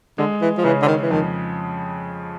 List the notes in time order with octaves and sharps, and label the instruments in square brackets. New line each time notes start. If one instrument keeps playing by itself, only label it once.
[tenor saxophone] D3 [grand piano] G#3
[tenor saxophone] E3
F3
[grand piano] C#3 [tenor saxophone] E3
[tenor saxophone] D3
D#3
E3
[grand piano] F2 [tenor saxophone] D#3